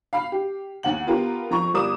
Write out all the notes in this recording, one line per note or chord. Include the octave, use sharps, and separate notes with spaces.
F5 B5 C7
G4
D#2 F#5 F#7
B3 F4 G4 A#4
F2 A#5 C#6
G1 G3 A#4 D6 D#6 E7